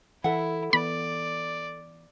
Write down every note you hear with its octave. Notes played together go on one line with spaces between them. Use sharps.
E3 E4 A4 E5 F#5
E3 B3 D5 B5